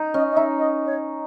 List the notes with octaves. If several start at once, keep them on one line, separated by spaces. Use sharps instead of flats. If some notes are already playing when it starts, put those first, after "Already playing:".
Already playing: D#4
C#4 D#5
D#5
D#4 E5
D#5
C#5